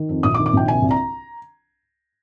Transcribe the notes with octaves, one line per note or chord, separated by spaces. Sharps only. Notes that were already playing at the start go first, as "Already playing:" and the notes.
Already playing: D#3
F2
A#1 D#6
D6
D#3
D6
A#1 G5
C3 G#5
C2
A#5